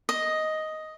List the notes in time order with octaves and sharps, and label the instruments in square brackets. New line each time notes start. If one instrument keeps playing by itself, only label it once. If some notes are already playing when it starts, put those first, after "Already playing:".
[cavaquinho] D#5